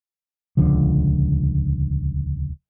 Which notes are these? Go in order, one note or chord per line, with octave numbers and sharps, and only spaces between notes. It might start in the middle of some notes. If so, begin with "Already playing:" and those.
D#1 C#2 D3 F3